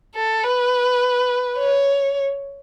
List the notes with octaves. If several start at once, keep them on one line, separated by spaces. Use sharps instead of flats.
A4
B4
C#5